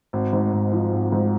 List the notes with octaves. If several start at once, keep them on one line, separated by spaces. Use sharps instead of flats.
G#1
G#2
G#1
F3
G#1
G#2